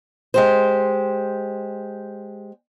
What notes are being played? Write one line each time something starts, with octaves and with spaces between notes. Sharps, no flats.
G#3 G4 C5